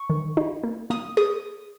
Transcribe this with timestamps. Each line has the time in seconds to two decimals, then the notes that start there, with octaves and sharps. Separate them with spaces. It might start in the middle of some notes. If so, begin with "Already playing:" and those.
Already playing: C#6
0.10 D#3
0.37 D#4
0.64 A#3
0.90 A#3 D#6
1.17 G#4 D#6